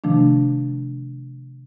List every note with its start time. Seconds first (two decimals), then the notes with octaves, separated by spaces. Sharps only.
0.04 C3 D#3 F3 A3 D4